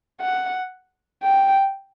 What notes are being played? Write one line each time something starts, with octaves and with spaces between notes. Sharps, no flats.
F#5
G5